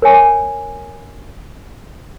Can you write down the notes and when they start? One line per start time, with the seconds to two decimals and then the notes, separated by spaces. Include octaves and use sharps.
0.02 A#4 C#5 G#5